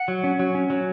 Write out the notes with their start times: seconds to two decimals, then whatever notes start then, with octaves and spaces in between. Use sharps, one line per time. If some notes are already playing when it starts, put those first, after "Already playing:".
Already playing: F#5
0.08 F#3
0.24 C#4
0.39 F#3
0.55 C#4
0.70 F#3